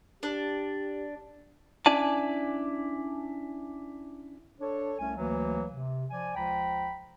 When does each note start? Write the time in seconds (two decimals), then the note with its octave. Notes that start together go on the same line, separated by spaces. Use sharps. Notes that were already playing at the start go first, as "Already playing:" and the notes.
0.23 D4 G4
1.86 C#4 D4 E4 D5 G#5 A5
4.60 D4 A4 C#5
4.99 C2 A3 C#4 G#5
5.16 D2 E3 F#3 A#3
5.71 C3
6.10 F3 D5 G#5
6.35 C#2 F3 G5 A#5 B5